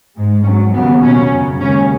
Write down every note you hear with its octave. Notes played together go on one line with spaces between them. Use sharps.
G#2 G#3
G#2 F#3 C#4
D#2 C#3 F#3 B3
B2 F#3 C#4
F#2 C#3 F#3
D#2 C#3 G#3 C#4